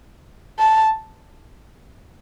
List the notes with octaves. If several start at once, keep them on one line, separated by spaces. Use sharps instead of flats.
A5